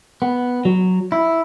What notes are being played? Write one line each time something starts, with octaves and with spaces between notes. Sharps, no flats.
B3
F#3
E4